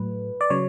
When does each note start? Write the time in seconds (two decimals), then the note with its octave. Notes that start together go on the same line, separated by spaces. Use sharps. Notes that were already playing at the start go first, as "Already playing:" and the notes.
Already playing: A2 F#3 A3 B4
0.41 D5
0.50 C#3 F#3 C#5